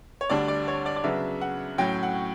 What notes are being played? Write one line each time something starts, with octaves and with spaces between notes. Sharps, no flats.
C#5
D2 D3 G3 D4 D5
D5
C#5
D5
D5
C#3 F#3 B3 D4 E5
F#5
A2 F#3 C#4 G5
F#5